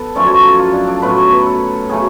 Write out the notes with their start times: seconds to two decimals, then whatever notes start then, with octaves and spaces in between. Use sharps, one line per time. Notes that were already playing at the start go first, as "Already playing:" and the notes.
Already playing: B3 A4 B4
0.15 F#2 F3 A3 C#4 D5
0.27 C#5
0.48 A4
0.59 F4
0.73 D4
0.87 D4
1.02 A2 F#3 B3 B4
1.17 C#5
1.32 B4
1.46 A4
1.89 C#3 F#3 A3 G#4